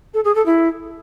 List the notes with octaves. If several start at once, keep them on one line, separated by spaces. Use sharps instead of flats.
A4
G#4
A4
E4